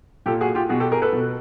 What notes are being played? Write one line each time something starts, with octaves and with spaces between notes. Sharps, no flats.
A#2 G4 A4
F#4 G#4
F4 G4
B2 F#4 G#4
G4 A4
G#4 A#4
A4 B4
B2